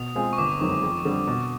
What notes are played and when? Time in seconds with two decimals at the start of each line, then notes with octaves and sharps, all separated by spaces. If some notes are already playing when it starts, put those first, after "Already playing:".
Already playing: B2 D#6
0.16 G#3 C4 F4 G#4
0.33 C#6
0.38 G1 D6
0.60 F#2 D#3 G#3 C4 C#6
0.82 F2
1.05 D3 G3 C4
1.27 B2